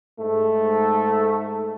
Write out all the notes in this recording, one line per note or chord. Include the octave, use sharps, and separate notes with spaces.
G#2 A3